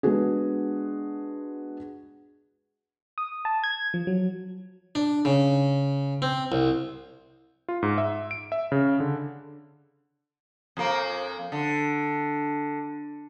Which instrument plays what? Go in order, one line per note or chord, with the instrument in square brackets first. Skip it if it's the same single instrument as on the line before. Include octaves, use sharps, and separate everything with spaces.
[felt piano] G#3 B3 D4 F#4 G#4
[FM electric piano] D#6
A5
G#6
F3
F#3
[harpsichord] D4
C#3
C4
C2
[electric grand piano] F4
G#2
E5
D7
E5
C#3
D3
[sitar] F2 A#3
D3